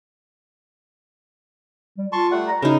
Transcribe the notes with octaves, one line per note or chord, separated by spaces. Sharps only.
G3
F4 A5 C6 C#6
G3 A3 F#5
A#5
C#3 D#4 E4 F#4 A#4